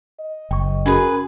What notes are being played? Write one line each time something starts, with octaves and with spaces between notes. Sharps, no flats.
D#5
F#1 G5 C#6
C#4 F#4 G#4 A#4 B4 G#5